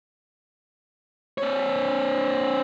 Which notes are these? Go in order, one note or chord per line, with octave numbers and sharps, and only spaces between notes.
C4 C#5